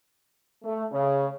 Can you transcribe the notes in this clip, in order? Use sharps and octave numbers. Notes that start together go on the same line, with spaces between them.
A3
C#3